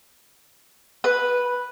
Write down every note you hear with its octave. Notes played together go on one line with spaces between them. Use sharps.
B4